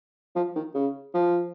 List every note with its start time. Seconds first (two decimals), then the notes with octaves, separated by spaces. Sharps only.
0.36 F3
0.56 D#3
0.75 C#3
1.14 F3